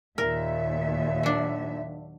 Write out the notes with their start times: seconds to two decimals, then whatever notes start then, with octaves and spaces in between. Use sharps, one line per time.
0.18 D#2 A#2 A#4 E5
1.23 F#3 D4